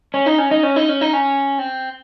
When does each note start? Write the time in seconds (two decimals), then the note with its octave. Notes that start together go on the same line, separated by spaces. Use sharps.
0.14 C#4
0.26 D#4
0.38 C#4
0.51 D#4
0.63 C#4
0.76 D#4
0.89 C#4
1.01 D#4
1.13 C#4
1.58 C4